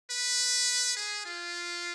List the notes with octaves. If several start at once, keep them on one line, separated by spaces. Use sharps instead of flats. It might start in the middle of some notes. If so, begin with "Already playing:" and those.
B4
G#4
F4